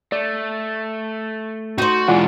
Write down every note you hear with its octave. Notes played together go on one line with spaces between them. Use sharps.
A3 D5
D#4 F#4 C5
E3 G#3 F4 D5 F#5